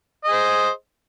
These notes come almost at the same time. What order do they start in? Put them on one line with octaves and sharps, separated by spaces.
D#5 G#4 C5